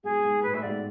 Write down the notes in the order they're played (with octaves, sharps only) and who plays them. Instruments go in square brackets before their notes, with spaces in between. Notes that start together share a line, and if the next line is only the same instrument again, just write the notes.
[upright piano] G#2 B2 [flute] G#4
[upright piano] G#2
[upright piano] A2 [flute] B4
[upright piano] A2 [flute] E5
[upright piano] G#2 B2 [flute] D5